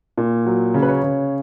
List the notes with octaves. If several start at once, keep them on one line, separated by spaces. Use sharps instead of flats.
A#2
F#3
C#3
B4
C#5
C#3